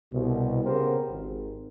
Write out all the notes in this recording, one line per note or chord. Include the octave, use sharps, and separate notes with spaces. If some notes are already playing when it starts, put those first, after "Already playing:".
C2 B2
C#3 B3 C4 G4 A#4 C5
G#1